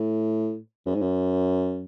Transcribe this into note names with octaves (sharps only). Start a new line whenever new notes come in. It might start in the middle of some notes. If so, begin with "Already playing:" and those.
Already playing: A2
F#2
G#2
F#2